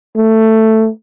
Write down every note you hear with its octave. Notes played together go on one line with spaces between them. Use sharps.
A3